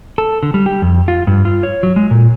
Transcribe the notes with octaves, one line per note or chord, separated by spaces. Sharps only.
A4
D3
G3
G4
F2
F4
G2
F4
C#5
F#3
G#3
A#2